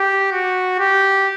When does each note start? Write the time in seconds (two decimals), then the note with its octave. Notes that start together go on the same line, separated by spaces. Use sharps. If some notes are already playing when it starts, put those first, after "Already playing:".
Already playing: G4
0.32 F#4
0.79 G4